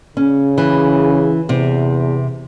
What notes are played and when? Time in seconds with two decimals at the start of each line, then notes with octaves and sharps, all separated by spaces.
0.17 C#3 C#4
0.58 E3
1.49 E2 C3